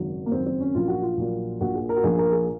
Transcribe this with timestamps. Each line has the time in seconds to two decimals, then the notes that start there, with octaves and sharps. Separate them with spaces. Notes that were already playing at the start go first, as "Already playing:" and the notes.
Already playing: G#1 F#2 C#3 F#3
0.26 A#3
0.32 G#1 F#2 C#3 F#3 C4
0.46 C4
0.60 C#4
0.75 A#1 A#2 F#3 F4
0.88 F#4
1.02 F4
1.17 A#1 A#2 F#3
1.61 A#1 A#2 F3 F#4
1.75 G#4
1.89 A#4
1.96 F#4
2.04 A#1 A#2 F3 G#4
2.18 A#4
2.32 G#4